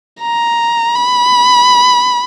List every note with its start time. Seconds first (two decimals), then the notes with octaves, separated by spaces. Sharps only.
0.21 A#5
0.95 B5